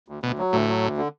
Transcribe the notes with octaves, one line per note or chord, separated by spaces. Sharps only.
D2
D2 B2
F#3
D2 A2
F#3
D2
D3